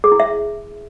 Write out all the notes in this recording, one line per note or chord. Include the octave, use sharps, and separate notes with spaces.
G#4
E4
E5